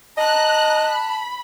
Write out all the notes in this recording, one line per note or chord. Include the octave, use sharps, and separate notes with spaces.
D#5 A5 A#5 F#6
B5